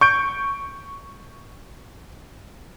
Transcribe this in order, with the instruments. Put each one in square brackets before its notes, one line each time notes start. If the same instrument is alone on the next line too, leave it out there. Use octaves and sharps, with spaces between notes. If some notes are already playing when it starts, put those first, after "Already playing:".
[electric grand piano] C#6 G6 D7